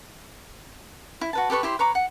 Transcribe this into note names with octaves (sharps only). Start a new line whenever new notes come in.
E4
F#4 B4 A5
G4 A4 B4 C#6
E4 G4 C5 C6
B4 C#5 A#5 D6
F#5